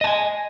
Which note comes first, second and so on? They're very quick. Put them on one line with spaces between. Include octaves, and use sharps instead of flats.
D#5 A5 G#5